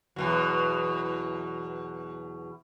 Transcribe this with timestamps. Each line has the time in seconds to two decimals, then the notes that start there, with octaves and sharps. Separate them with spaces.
0.16 E2 B2 F#3